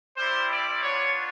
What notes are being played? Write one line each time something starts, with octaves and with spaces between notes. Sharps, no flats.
G3 C4 E4 C5
D5
B3 D4 F4 C#5